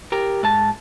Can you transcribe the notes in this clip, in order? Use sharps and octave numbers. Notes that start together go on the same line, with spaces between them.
G4 A#4
G#2 A5